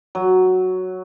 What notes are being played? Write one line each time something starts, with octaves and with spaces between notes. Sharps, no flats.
F#3